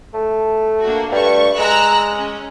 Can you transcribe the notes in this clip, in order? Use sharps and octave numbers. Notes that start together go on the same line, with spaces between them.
A3
A#3 D4 F#4
G2 A3 C#6
G#3 A#5 E6 F#6
C#4